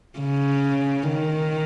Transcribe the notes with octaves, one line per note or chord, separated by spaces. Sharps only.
C#3
D#3